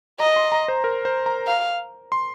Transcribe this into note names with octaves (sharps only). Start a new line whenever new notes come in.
D#5 A#5
C6
A#5
C5
A#4
C5
A#5
F5
C6